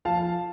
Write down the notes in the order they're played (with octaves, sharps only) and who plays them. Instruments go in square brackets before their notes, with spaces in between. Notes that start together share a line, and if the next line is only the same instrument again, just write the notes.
[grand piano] F3 F5 A5